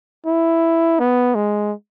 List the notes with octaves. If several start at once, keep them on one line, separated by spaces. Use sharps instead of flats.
E4
B3
G#3